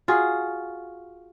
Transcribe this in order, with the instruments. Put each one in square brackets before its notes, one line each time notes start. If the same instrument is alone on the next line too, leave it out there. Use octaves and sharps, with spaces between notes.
[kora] F4 F#4 G#4